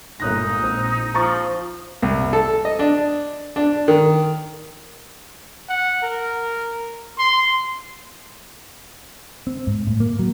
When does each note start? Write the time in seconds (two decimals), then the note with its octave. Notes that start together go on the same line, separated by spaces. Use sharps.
0.20 G1 A#2 G#3 A#3 D#4 F#6 A#6
0.63 A#1 C4
1.14 F3 A#5 C#6 A6
2.02 C2
2.33 A4
2.65 D#5
2.79 D4
3.56 D4
3.88 D#3
5.69 F#5
6.02 A#4
7.19 C6
9.47 C4
9.67 G#2
9.87 A2
10.00 A#3
10.19 F#3